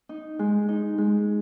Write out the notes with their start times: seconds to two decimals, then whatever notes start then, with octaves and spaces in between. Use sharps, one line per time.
0.09 D#4
0.39 G#3
0.69 D#4
0.98 G#3